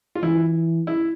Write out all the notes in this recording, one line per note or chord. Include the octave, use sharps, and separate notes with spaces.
F4
E3 E4
E4